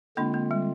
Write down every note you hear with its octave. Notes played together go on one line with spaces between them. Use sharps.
D3 G#3 A#3 C4 D4 F4
A#3
G3